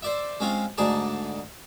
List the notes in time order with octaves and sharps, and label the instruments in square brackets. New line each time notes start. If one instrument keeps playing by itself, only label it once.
[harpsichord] C5 D5 E5
G#3 C4 C#4 F4
D2 G#2 D#4 G#4 D5 A5